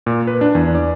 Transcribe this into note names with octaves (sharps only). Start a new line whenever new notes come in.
A#2
B4
D4
E2
D5